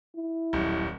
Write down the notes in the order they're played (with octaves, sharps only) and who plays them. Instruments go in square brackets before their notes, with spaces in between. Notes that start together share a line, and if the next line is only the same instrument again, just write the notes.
[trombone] E4
[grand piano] D#1 B1